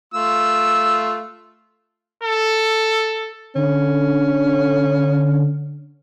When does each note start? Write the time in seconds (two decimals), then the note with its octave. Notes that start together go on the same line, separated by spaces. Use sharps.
0.14 A3 F4 E6
2.23 A4
3.55 D3 C#4